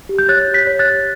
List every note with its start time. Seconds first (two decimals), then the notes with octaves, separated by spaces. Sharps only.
0.09 G4
0.19 G6
0.29 C#5 F#6 A6
0.48 G4
0.54 G6 B6
0.67 C#5
0.79 F#6 A6
0.86 G4